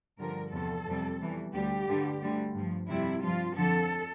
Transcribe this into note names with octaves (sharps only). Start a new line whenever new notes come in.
G2 D3 F3 A#4
E2 C3 F3 A4
F2 C3 G3
E2 E3 G3
D2 D3 G3 G4
G2 D3 G3
D2 D3 G3
G2 F3
F2 C3 G3 E4
G2 F3 F4
F2 D3 F3 A4